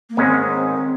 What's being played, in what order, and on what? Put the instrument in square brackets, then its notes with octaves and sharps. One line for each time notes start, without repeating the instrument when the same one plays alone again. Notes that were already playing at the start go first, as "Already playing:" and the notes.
[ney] A#3
[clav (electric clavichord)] G#2 D#3 G#3 C#4 [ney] C4